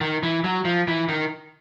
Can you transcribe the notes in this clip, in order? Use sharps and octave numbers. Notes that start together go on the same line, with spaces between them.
D#3
E3
F#3
F3
E3
D#3